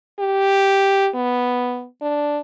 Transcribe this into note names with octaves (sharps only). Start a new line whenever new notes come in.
G4
B3
D4